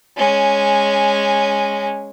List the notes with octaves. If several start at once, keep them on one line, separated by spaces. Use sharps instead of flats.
G#3 C#4